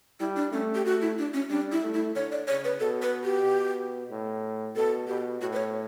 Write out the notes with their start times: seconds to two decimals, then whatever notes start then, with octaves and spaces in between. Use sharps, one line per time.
0.20 G3 E4
0.36 D4
0.52 A3 C#4
0.75 G4
0.85 A3 F#4
1.01 E4
1.18 D4
1.34 C#4
1.50 G3 D4
1.72 E4
1.83 A3
1.94 E4
2.15 D3 C#5
2.32 D5
2.48 C#3 C#5
2.64 B4
2.80 B2 A4
3.02 B4
3.24 G4
3.45 B2
4.11 A2
4.76 B2 A4
5.07 B2 G4
5.40 A2 F#4
5.53 B4
5.57 C#5